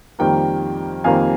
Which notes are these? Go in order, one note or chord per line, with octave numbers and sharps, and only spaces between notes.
F2 D#3 G3 A#3 G5
F2 D#3 G3 A#3 F5 G#5